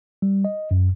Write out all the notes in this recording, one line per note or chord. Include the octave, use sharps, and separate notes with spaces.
G3
D#5
F#2